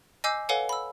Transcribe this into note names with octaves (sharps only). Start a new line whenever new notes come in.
D#5 G#5 D6 E6 G6 C7
A4 B4 C#5 F5 F#5 G#5
B5 E6